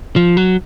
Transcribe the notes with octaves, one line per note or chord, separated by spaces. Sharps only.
F3
F#3